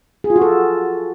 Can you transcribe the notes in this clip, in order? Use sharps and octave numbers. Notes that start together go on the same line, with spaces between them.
G#4
F4
F#4
A4